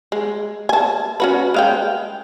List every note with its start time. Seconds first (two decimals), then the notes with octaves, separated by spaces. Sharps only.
0.12 G#3
0.69 G#5 A5
1.20 C#4 F#4 B4
1.54 G#3 F5 G5